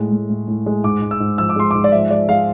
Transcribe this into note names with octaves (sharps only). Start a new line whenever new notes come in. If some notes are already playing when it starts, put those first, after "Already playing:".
Already playing: A2 G#3 A3
A2
A2
A2
G#3
G#2 D6
G#2
E6
G#2
F3 E6
D6
G#3 C6
G#2 D6
D5
F3 E5
G#3 D5
G#3 F5